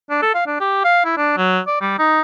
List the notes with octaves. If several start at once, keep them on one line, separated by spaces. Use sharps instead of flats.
D4
A4
F5
D4
G4
F5
E4
D4
F#3
D5
G3
D#4